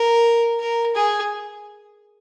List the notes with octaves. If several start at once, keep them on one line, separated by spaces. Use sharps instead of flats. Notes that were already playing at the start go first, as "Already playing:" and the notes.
Already playing: A#4
A#4
G#4